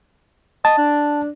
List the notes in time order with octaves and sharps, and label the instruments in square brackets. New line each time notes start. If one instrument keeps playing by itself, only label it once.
[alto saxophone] D#5 [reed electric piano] A5
[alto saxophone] D4